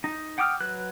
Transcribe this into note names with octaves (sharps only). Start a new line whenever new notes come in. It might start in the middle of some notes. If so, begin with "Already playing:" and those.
D#4
F#5 G5 D6 D#6 F6
F#3 B4 F#6